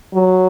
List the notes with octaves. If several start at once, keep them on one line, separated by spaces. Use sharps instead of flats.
F#3